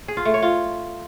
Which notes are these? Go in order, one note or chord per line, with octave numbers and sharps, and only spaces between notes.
G#4
F4
A3
C#5
F4